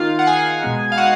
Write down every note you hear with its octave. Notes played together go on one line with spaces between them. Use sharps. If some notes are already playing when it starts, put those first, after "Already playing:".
Already playing: D#3 A#3 D#4 F4 F5
F#5
G#4 G#5
B2 G#3 B3 D#4
F5
F#4 F#5